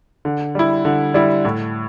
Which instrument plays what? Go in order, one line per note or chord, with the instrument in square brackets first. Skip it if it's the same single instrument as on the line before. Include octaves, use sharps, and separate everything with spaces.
[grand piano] D3
G3 E4
D3
G3 E4
A2